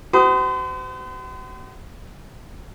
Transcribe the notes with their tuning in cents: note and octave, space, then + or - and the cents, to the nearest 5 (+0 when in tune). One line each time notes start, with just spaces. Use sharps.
F#4 +40 C5 -40 D#6 +0